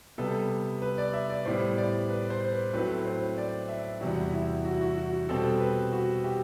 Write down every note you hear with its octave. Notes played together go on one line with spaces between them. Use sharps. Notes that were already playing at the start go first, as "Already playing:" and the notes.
C3 G3 B3 A4
B4
D5
E5
D5
A2 G3 B3 C5
D5
B4
C5
B4
A2 F#3 A3 C4 B4
C5
D5
E5
E2 C3 G3 F#4
E4
F#4
E4
F#4
F#4
B2 G3 C4 A4
B4
F#4
G4